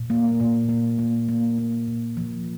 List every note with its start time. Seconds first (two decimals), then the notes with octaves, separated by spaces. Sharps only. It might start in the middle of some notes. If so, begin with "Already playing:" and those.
Already playing: A#2
0.10 A#3
0.40 A#2
0.69 A#3
0.99 A#3
1.28 A#3
1.58 A#3
1.87 A#2
2.17 F3